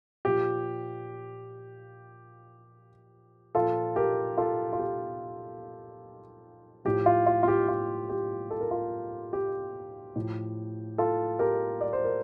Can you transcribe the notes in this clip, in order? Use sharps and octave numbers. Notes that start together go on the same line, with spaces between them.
A#2 F3 G4
A#2 F3 F4 A4
G4 A#4
F4 A4
F4
G4
A2 F3 G4
F4
F4
F4
G4
F4
G4
A4
A#4
F4 A4
G4
A2 F3
F4 A4
G4 A#4
D5
C5
A#4